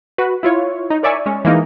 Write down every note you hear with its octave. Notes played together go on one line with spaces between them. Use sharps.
F#4 B4
E4 F4 C#5
D#4
A#4 C#5 D5 E5 G#5 C#6
G#3 C#4
E3 G#3 A#3 D#4